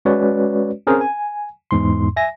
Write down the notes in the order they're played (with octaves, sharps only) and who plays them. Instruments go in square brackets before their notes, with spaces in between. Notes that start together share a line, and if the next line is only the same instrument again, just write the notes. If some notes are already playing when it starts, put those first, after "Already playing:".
[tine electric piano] G#3 C#4 F#4 B4 C#5 D5
C4 C#4 G#4 A#4 C5
G#5
E2 G#2 C6
E5 G#5 A#6